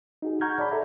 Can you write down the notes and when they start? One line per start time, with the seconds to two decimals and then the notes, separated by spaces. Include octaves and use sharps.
0.22 D#4 F#4 G#4
0.41 F#5 A#5 C#6 F6 G6 G#6
0.58 C#5 D5 A5 B5
0.71 A4 E5 A#5